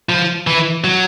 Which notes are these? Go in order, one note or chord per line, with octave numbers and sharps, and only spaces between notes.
F3
E3
F#3